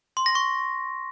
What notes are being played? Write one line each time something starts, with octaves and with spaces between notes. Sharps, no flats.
C6
A#6
C#6